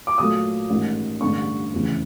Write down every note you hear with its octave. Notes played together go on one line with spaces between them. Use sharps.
D6
A#2 F#3 A3 D#6
A1 G#2 D#3
A1 G2 D3 C#6
F1 E2 C#3 E3